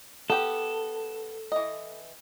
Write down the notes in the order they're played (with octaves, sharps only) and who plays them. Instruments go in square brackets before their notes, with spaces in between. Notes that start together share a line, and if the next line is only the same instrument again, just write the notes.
[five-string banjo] B3 G4 [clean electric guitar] A4
[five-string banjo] E3 D#5